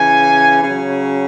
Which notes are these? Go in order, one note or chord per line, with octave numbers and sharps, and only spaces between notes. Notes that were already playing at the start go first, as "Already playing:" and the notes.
Already playing: C#3 E3 G#5
C#3 F#3